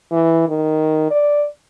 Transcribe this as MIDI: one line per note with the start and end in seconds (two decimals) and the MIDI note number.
0.12 0.47 52
0.48 1.07 51
1.11 1.46 74